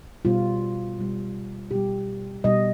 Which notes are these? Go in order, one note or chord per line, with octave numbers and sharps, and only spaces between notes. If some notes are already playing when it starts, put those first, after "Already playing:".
B2 G3 F4
B2 G3
B2 G3 G4
B2 G3 D#5